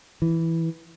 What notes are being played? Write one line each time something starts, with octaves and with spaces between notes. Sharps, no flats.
E3